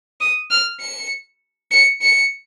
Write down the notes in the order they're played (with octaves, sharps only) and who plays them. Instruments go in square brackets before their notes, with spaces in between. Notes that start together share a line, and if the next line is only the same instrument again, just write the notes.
[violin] D#6
F6
C#7
C#7
C#7